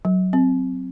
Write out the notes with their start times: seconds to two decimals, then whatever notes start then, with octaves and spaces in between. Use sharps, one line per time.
0.05 F#3
0.33 C4